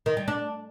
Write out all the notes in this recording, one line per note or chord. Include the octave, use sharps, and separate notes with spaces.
D#3
G3
D4